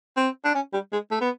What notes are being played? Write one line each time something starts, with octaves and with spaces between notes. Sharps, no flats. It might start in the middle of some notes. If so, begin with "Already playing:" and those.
C4
D4
C#4
G3
G#3
A3
B3